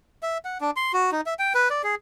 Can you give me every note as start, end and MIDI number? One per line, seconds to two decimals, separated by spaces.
0.23 0.38 76
0.45 0.58 78
0.61 0.71 62
0.76 0.92 84
0.93 1.11 66
1.12 1.21 63
1.26 1.34 76
1.39 1.53 79
1.54 1.69 71
1.70 1.82 74
1.84 1.95 68